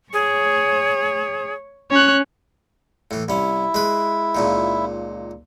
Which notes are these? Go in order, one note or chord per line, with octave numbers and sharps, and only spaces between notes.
G#4 C#5
C#4 C#5 F#6
A2 E3
C2 C#4 E4
G#3 B4
C#2 A#2 D#3